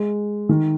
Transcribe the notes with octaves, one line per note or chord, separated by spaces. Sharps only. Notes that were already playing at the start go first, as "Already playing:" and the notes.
Already playing: G#3
D#3